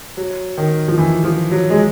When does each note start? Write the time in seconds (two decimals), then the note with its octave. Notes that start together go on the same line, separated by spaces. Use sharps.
0.17 F#3
0.58 D#3
0.88 F3
0.98 E3
1.24 F3
1.51 F#3
1.70 G#3